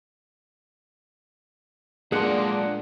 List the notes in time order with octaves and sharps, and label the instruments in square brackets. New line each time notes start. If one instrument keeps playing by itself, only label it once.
[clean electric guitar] A#2 F#5 [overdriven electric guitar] G#3 A#3 [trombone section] D4 [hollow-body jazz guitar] G#4 C6